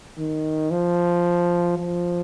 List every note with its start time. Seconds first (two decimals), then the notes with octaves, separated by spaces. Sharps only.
0.18 D#3
0.71 F3
1.78 F3